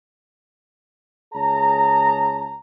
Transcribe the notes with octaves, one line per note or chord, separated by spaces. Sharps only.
C#2 G#4 C#5 A5 A#5